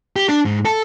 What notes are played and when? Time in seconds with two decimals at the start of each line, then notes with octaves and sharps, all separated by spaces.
0.16 G4
0.29 D4
0.45 G#2
0.65 A4